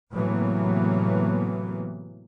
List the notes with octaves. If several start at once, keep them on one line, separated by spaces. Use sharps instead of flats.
A2 C3 E3 F#3 A#3 B3